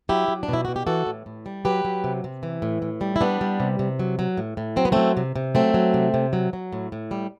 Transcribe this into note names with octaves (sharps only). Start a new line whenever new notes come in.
F#3 E4 G4
F#3
D4
B2 E4
B2 F#4
G4
E3 F#4 A4
A2
A2
G3
F#3 G4 B4
F#3
C3
C3
E3
A2
A2
G3
E4
G3 B3 D4
G3
C3
C3
F#3
F#3
A2
A2
F#3 C4
B3
F#3 A3 C4
C3
C3
F#3 A3 C4
F#3
C3
C3
F#3
F#3
A2
A2
G3